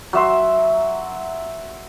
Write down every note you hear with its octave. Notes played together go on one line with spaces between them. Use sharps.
F#3 E5 C6